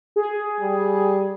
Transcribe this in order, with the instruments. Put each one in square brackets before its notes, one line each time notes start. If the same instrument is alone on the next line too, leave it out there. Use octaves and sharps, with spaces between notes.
[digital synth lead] G#4
[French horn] G3